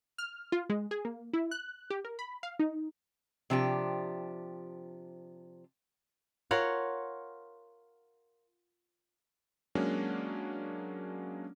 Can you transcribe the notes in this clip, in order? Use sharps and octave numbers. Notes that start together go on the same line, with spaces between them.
F6
F4
G#3
G#4
A#3
E4
F#6
G4
A#4
B5
F5
D#4
C3 F3 D4 G4
F4 A#4 C#5 F#5
F#3 G#3 A#3 C#4 D4